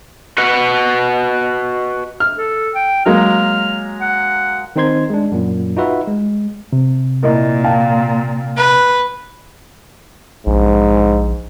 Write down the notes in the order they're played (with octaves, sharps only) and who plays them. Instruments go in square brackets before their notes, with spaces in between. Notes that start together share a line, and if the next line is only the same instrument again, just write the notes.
[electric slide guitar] F#4 B4 D#5 F#5
[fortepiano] F6
[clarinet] A4
G5
[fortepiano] F#3 G#3 A#3 [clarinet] F6
[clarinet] F#5
[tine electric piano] D#3 C4 D#4 C5 C6 G#6
G#3 D4
F#2 A#2
D#4 F4 F#4 B4 E5
G#3
[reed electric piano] C3
[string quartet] A#2 [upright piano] E4 A#4 D#5
[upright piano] F5 G5 A5
[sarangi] B4
[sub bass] A#1 [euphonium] G#2